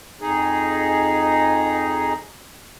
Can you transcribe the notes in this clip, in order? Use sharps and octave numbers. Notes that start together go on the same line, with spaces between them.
F2 D#4 G#4